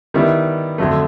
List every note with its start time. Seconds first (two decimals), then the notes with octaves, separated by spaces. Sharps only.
0.14 D#3 G3 B3 E4
0.78 F2 D3 F#3 A3